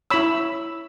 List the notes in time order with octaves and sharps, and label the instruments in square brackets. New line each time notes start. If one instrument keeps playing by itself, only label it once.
[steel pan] E4 C#5 B5 E6